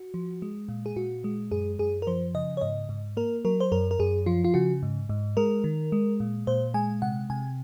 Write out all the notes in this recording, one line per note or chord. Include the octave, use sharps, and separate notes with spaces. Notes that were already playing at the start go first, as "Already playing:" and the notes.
Already playing: F#4
F3
G#3
A#2
G#4
A#2 F#4
G#3
F#2 G#4
F#2 G#4
A#4
F3 C5
C#3 D#5
C#5
G#2 D#5
G#2
A#3 A#4
F#3 A#4
C5
F#2 A#4
A#4
F#2 G#4
F3 F4
F4
C#3 F#4
G#2
G#2
G#3 A#4
D#3
G#3
A#2
A#2 C5
G#3 G#5
C3 F#5
C3 G#5